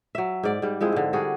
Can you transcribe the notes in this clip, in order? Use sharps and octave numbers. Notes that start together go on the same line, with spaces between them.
F#3 E5
G#2 D5
G#2 G3
F3 G#3 C4 E4
G#2 D3
G3 D4 F#4 G#4